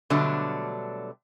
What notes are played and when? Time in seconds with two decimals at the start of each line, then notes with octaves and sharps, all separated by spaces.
0.10 B2 D3 F#3 G3 A3 D4